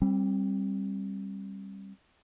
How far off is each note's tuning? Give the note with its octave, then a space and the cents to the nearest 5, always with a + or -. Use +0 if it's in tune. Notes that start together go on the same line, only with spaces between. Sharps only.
G3 +0 C4 +30